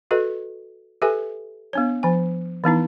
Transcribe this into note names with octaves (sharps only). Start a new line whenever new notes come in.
F#4 A4 B4 D#5
G4 A4 B4 E5 G#5
B3 D4 C#5
F3 G#5
E3 B3 D#4 E4